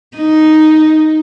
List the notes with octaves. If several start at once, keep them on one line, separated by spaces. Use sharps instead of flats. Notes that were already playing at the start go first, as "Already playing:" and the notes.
D#4